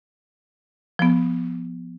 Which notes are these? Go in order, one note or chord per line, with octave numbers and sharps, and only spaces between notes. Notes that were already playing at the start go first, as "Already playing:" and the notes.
F3 B3